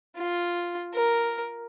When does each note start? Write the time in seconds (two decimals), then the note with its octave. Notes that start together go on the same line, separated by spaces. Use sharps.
0.17 F4
0.94 A#4